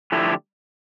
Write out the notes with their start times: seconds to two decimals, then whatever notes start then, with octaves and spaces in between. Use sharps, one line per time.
0.12 D3 F3 A3 E4 G4